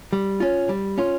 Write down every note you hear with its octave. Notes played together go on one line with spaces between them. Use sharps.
G3
C#4 F4
G3
C#4 F4